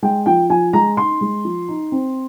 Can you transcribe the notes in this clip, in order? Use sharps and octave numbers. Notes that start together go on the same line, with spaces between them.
G#3 G5
F3 G5
F3 G#5
G#3 A#5
D#4 C6
G#3
F3
D#4
C4